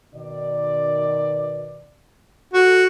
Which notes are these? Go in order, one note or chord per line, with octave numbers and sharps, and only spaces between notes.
B2 D#3 D5
F#4 A4